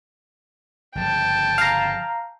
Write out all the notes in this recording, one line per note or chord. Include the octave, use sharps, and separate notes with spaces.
G1 C#3 F3 G5 A5
F5 A#5